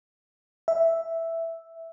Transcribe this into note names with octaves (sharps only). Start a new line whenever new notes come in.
E5